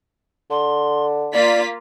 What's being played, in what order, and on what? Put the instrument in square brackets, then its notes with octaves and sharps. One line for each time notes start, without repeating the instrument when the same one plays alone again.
[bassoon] D3 [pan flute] C6
[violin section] A#3 F4 B6 [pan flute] D5